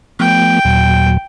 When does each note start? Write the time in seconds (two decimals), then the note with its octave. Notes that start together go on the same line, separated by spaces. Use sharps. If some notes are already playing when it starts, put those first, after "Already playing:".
0.20 F3 A3 B3 G5
0.65 D#2 A#2 F#3